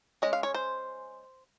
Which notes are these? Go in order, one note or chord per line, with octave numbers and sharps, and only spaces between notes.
G#3 C#4 D#5
F5
C#5
C5